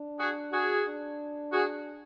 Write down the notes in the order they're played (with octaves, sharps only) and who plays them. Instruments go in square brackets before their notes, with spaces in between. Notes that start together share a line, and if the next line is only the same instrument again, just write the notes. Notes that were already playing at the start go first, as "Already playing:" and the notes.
Already playing: [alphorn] D4
[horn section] F#4 G#4
F#4 G#4
[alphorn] D4
[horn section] F#4 G#4